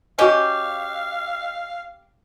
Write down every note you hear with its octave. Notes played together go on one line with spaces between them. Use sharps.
C#4 F#4 G4 D#5 F5